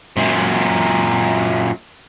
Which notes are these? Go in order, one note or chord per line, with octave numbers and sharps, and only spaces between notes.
F#2 A#2